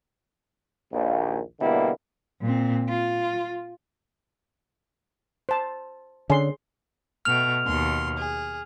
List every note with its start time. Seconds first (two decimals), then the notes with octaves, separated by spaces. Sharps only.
0.92 A#1 D#2
1.60 B2 D3 G3 A#3 E4
2.41 A#2 C4
2.89 F4
5.49 C5 A5
6.30 D3 C#4 G#4 C6
7.25 B2 A3 G5 F6 F7
7.65 D#2 B2 C6
8.18 G#4